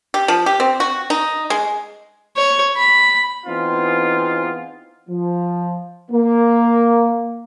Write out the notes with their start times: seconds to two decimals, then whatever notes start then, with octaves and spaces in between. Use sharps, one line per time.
0.14 G4
0.28 F3
0.46 G4
0.60 C4
0.80 F#4
1.10 D#4
1.50 G#3
2.36 C#5
2.77 B5
3.46 E3 B3 C4 D#4 F4 G#4
5.09 F3
6.11 A#3